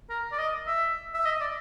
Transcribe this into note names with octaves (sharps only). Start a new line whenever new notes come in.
A#4
D5
D#5
E5
E5
D#5
D5